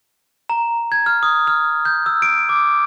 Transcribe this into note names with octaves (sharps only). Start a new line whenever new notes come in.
A#5
G#6
F6
D#6
F6
G6
E6
D7
D6